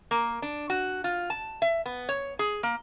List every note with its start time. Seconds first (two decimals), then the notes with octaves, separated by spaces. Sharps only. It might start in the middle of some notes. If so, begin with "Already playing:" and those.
0.11 A#3
0.42 D4
0.70 F#4
1.04 F4
1.30 A5
1.62 E5
1.86 B3
2.09 C#5
2.39 G#4
2.63 A#3